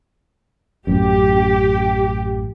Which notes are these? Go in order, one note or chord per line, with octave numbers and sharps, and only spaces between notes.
A1 F#2 G4